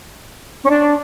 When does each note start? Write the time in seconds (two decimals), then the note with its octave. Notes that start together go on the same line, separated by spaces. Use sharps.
0.64 C#4
0.69 D4